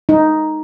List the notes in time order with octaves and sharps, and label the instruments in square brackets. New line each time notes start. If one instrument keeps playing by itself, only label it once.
[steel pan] D#4